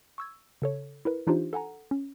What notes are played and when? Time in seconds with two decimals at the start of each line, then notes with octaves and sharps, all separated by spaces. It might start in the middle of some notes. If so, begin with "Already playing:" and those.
0.18 C#6 E6 G#6
0.62 C#3 A4 C#5
1.05 E4 A#4 B4
1.27 E3 D4 D#4 F4 G4 C5
1.53 A4 F#5 G#5 A#5
1.91 C#4